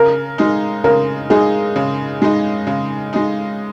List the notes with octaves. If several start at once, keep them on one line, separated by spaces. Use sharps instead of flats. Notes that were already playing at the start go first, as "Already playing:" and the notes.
Already playing: C#3 A#4
G#3 D#4
C#3 A#4
G#3 D#4 G#4
C#3
G#3 D#4
C#3
G#3 D#4